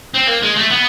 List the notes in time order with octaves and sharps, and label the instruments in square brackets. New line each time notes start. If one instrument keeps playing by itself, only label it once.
[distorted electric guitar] C4
A#3
G#3
A3
B3